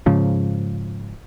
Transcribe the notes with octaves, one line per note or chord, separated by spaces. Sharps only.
G#2 C#3 F3